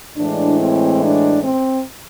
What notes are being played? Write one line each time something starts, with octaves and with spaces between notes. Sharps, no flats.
A2 E3 G#3 D4
C4
D4
C4